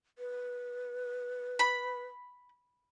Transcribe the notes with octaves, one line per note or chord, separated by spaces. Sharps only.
B4
B5